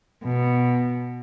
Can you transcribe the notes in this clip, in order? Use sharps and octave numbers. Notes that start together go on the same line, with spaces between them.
B2